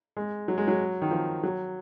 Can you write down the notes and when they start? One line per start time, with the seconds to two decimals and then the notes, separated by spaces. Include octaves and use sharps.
0.17 G#3
0.48 F#3
0.58 G#3
0.68 F#3
1.02 D#3
1.11 F3
1.43 F#3